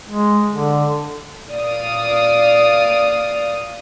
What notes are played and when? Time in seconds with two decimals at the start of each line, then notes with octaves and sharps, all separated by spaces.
0.09 G#3
0.52 D3
1.51 A#2 D5 F5 D#6